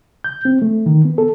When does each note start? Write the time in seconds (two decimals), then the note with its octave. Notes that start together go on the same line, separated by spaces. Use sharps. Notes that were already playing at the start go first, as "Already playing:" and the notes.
0.24 G6
0.45 C4
0.62 A3
0.86 D#3
1.05 B3
1.18 A4